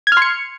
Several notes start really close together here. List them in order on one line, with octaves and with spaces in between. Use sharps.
G#6 F6 C6 C#7